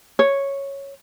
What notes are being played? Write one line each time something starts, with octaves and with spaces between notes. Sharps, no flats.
C#5